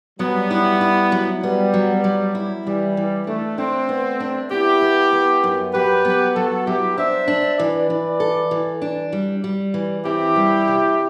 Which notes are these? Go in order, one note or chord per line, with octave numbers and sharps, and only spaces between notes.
F#3 G3 B3
E4
E4
F#3
G3 B3
F#3
F#3
E4
E3 G3
E3
A3 D4
A3 C4 D4
B3
D4
B3 E4 G4
B3
B3
F#2
F#3 G4 B4
B3
F#3 F#4 A4
F#3 E4 G4
D4 C5 E5
D4
E3 B4 D5
E3
A4
E3
D4
G3
G3
E3
C4 E4 G4
G3
C3